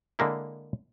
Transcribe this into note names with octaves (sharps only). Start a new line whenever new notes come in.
D3 G#3 A#3 E4